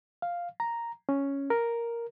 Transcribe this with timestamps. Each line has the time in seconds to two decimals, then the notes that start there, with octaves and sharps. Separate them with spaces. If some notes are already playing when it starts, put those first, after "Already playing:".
0.22 F5
0.60 A#5
1.09 C#4
1.50 A#4